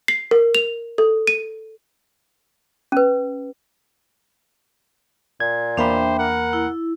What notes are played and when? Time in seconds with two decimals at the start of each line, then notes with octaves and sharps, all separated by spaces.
0.08 C7
0.31 A#4
0.55 F7
0.98 A4
1.27 D#7
2.92 C#4 B4
5.40 A#2 G#6
5.77 E2 A#3 D4 C5 E5 G5 B5
6.19 A#4 F#5
6.53 E4